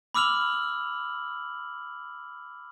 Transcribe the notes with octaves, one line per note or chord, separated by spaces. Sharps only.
B5 D6 E6 F6 F7 F#7